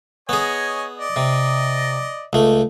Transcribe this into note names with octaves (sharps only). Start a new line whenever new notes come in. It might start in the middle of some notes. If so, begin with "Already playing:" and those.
B3 G#4 C#5 D#5 G#5
D5 D#5
C3
C#2 A3